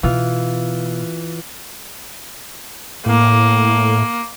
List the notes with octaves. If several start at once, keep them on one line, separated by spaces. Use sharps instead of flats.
B2 E3 F4
A2 A#3